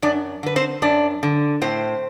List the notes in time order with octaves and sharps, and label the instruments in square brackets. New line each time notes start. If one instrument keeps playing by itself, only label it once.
[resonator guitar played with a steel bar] F#2 D4 D5
D3 B4
C4 C5
F#2 D4 D5
D3
A2 C4 C5